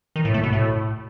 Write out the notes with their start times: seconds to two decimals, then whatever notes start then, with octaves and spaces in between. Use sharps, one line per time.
0.16 D#3
0.25 A2
0.34 A3
0.43 B2
0.53 A2